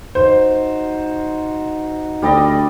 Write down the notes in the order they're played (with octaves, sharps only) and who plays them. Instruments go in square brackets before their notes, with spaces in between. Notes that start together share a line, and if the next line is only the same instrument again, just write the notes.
[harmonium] D#4 F#4 [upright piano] C5
[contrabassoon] D2 [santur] G3 D5 D#5